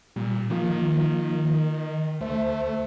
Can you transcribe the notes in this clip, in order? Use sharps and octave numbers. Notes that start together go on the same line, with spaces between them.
A#2 G3
D#3 F3 A#3 F4
D2 A3 C5 E5